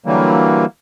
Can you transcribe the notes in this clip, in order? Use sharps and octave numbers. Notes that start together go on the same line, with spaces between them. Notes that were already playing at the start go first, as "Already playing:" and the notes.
D3 E3 F#3 G3 A#3